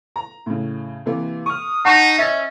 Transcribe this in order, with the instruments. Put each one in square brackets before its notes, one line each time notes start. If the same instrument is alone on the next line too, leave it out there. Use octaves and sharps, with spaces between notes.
[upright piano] A#5
A2 C#3
C3 E3 A#3
[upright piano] C#6 F6 [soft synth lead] D#6
[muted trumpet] D#4 [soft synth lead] F#5 [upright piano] A5 C#6 E7
[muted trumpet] C#4 [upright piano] D#5 E6 A6 [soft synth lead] E5